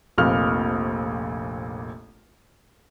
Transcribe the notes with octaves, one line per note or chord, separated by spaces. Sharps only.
F1 A#1 A#2 F6